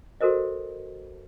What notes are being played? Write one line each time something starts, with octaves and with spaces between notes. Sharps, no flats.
F#4 A4 A#4 C5 D#5